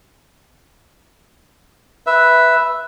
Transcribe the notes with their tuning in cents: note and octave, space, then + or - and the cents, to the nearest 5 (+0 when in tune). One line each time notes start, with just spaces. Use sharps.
B4 +0 E5 +0